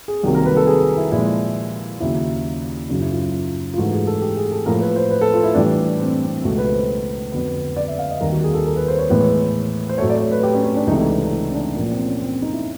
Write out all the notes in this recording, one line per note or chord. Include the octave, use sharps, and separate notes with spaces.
G#4
C2 C3 D#3 F#3 A#3
A#4
B4
A4
G#4
E4
A#2 F3 G#3 E4
D#2 C#3 F#3 E4
F#2 C#3 F#3 D#4
E4
F4
F4
F4
G#2 E3 A3 F#4
G#4
A4
G4
G#4
A4
A2 F3 A#3 A#4
B4
C5
B4
A4
F4
E4
A2 E3 G3 D4
C4
C4
C#2 B2 F#3 A3 F#4
B4
C5
F2 D3 F#3 B3
D5
E5
F5
D#5
D#2 D#3 G3 A#3 A#4
F#4
G#4
A4
A#4
B4
C5
C#5
A2 E3 G#3 B3
C5
A2 F#3 A3 C#5
D5
C#5
B4
G4
C#4
C#4
D4
C#2 C3 E3 A3 D#4
D#4
D4
D#4
E4
C#4
D4
A#2 F3 A#3
C4
C#4
C4
D#4
E4